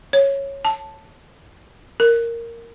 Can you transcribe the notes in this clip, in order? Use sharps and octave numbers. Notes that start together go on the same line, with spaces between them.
C#5
A5
A#4